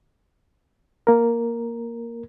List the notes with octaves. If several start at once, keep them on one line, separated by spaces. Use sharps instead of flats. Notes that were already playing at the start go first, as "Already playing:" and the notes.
A#3 A#4